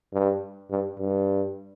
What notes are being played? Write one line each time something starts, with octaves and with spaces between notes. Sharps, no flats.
G2
G2
G2